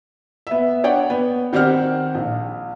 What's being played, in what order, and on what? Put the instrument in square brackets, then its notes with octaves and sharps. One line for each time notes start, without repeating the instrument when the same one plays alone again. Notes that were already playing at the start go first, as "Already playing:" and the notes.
[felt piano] B3 E5
D4 C#5 D5 F#5 G5
B3
D#3 C4 G4 D5 F#5 F6
A#1